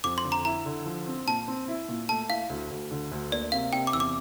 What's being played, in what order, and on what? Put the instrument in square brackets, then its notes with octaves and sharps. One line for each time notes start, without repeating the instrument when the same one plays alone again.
[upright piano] F2 [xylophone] D6
[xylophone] C6
[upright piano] D3
[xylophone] A#5
[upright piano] E4 [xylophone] A#5
[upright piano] D3
F3
C4
[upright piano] A#2 [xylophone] A5
[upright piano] C4
E4
A#2
[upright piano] A3 [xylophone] A5
[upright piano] E4 [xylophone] F5
[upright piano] D2
D2
D3
D2
[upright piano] A#3 [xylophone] D5
[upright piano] C3 [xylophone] F5
[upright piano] C3 [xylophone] G5
[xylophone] D6
[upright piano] E2 [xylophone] E6
[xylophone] D6